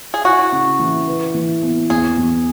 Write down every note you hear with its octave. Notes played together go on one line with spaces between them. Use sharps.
G#4
E4 F#4
C#3
E3
B4
E3
B3
E2 G#4
E2